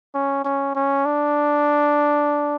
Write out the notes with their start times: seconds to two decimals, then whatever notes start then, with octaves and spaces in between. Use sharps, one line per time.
0.15 C#4
0.45 C#4
0.75 C#4
1.05 D4